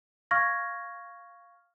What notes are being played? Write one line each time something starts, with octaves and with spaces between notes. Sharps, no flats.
F5 C#6 F6 G#6 A#6